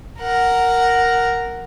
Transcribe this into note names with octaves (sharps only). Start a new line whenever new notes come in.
A#4 F#5